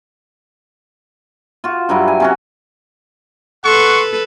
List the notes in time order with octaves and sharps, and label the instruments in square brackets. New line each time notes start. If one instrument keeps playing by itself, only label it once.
[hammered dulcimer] F4 F#4
G2 F#3 G3 E4
G#5
C3 C#4 F#4
[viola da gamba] A4 B4 [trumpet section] F#5 C6 C#6